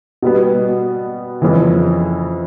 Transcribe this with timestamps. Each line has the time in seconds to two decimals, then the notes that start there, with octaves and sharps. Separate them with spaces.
0.22 B2 G3 B3
1.42 F2 C#3 E3